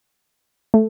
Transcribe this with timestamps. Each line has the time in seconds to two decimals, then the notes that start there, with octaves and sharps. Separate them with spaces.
0.74 A3